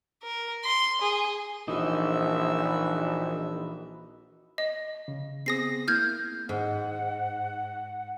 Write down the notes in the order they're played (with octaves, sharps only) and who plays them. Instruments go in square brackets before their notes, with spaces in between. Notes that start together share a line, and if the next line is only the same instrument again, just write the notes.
[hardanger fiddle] A#4
C6
G#4
[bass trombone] A#1 [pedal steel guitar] E3 D#4 [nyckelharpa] F#4 E5
[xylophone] D#5
[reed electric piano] C#3
[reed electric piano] B3 C4 G#4 [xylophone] D#6 A#6 C7
[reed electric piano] A#3 E4 [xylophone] F6 G6 G#6
[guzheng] G#2 [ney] F#5